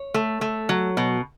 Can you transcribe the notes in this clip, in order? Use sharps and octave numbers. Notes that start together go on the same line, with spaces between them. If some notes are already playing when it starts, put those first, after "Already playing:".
Already playing: C#5
A3
A3
F#3
B2